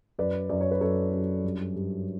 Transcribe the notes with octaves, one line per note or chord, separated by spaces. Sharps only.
F#2 B4 D5
F#2 D5
C#5
B4
F#2 A4 C#5
F#2
G2
G2